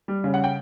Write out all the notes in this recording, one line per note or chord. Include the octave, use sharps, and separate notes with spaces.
G3
C#3
F#5
G5